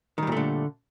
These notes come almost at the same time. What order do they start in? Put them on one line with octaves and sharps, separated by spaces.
D#3 G3 A#2 A3 D3